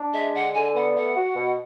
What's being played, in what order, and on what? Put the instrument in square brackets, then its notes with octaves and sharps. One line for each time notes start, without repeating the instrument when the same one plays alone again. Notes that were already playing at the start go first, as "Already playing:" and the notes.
Already playing: [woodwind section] D4
[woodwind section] G#3 [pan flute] E5
[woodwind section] D3 [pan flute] F#5
[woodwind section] D3 [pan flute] G#5
[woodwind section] B3 [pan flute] F#5
[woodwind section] A3 [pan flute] F#5
[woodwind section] F#4
B2